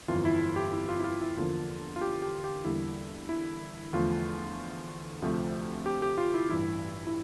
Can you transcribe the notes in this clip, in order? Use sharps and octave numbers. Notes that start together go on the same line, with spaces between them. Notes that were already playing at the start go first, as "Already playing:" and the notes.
G1 F2 E3 F4
E4
G4
E4
F4
E4
F4
E4
E2 D3 F3 A#3 F4
F4
G4
G4
G4
E2 D3 G3 A#3 E4
E4
E2 D3 F3 A3 F4
D2 C3 F3 A3
G4
G4
F4
E4
A1 G2 E3 E4
E4